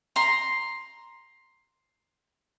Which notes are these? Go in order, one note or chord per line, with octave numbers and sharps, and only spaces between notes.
A#5 C6